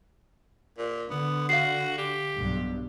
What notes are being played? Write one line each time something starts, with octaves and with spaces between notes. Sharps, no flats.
A#2
D3 B3
F#4 F5 C7
G4
B1 G2